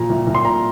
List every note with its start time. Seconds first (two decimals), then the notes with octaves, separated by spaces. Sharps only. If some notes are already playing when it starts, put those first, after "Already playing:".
Already playing: A#2 F3 A#5
0.10 C2
0.27 C2
0.35 C6
0.45 A#2 A#5